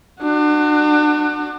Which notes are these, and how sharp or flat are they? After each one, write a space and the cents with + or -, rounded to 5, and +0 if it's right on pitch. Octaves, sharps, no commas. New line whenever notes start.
D4 +35 F#4 +0